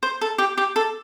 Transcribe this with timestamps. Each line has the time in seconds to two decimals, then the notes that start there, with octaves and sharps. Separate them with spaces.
0.03 C5
0.21 A4
0.38 G4
0.57 G4
0.76 A4